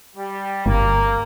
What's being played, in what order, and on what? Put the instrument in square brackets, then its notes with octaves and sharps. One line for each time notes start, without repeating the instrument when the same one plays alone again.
[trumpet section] G3
[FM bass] G1 [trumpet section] A#3